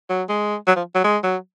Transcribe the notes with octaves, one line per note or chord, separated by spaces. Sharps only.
F#3
G#3
F#3
F3
F#3
G#3
F#3